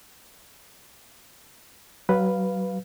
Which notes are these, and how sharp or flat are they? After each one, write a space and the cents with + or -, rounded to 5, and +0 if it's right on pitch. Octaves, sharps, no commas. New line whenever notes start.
F#3 +35 B4 +0 F5 +0